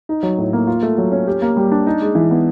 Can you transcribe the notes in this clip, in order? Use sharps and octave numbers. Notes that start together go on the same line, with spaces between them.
D#4
F#3
A2
A#3
F4
A3
F#3
C#4
G4
A#3
G3
D4
D#4
G#3
E3
B3